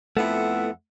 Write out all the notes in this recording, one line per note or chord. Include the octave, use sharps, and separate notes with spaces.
F2 A3 B3 E4 E5 F#5